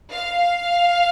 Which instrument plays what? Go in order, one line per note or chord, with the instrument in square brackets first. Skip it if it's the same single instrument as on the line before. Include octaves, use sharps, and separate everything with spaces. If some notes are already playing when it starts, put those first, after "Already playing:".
[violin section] F5